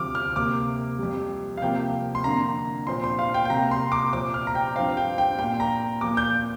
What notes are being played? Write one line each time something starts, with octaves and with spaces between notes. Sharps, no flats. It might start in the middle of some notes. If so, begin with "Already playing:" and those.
Already playing: D2 C3 F3 C4 D6 F6
F6
C2 C3 A#3 D6
F2 C3 G3
F5
C2 C3 F3 A#3 G5
C6
F2 D3 A#3 A#5
A#2 F3 C4 C6
C6
F5
G5
G5
C2 C3 A#3 A#5
C6
D6
A#2 F3 C4 D6
F6
A#5
G5
G2 F3 C4 F5
G5
G5
A#2 A#3 G5
A#5
A#2 F3 A#3 D6
G6